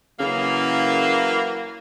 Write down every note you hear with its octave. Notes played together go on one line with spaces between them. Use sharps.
C#3 E3 F#3 A#3